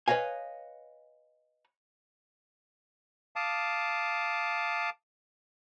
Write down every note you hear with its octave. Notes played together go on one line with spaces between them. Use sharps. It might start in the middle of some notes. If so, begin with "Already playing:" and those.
B4 C#5 D#5 F5 G#5
F5 A5 D6 D#6